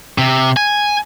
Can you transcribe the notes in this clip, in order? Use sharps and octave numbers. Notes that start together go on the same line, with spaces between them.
C3
G#5